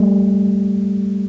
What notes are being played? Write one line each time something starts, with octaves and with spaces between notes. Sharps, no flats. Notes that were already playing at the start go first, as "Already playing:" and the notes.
Already playing: G3 A3